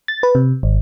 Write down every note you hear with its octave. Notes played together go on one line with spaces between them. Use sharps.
A6
B4
C3
G#1